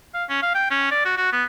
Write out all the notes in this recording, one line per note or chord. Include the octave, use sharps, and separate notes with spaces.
F5
C#4
F5
G5
C#4
D5
F#4
F#4
B3